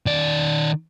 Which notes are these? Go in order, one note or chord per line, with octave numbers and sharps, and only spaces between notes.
D#3 D5